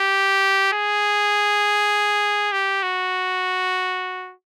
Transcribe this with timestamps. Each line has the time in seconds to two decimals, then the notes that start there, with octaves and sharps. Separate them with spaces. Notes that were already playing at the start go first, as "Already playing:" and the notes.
Already playing: G4
0.73 G#4
2.52 G4
2.83 F#4